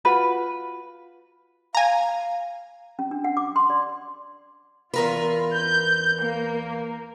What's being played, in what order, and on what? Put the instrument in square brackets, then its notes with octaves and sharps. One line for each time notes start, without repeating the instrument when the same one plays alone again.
[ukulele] F4 F#4 B4 B5
[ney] F5 [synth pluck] G#5 A#5
[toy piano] C#4
D4
F#5
D6
C6
D5
[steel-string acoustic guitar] E2 A#4 B4 [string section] F4
[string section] G6
A#3